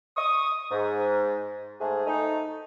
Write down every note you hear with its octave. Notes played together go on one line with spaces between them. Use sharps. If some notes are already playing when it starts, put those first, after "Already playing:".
C#6 D#6
G#2
G#2 A3 G#4
A3 D#4